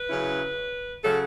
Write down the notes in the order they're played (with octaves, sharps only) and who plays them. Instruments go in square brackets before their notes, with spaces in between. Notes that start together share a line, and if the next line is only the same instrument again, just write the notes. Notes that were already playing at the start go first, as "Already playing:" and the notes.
Already playing: [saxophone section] B4
C#3 F#3 C#4 E4
C#3 F#3 C#4 A4